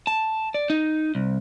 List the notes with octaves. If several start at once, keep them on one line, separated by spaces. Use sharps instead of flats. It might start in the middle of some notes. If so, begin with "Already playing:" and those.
A5
D5
D#4
C2